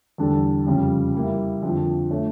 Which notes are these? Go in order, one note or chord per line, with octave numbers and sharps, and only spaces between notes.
E2 D3 G3 D4 A4
F2 C#3 G3
G3 A#3 E4
F2 D3 F3
F3 A3 D4 A4 C#5